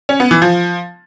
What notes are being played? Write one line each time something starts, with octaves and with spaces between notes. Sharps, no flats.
C#4
B3
E3
F3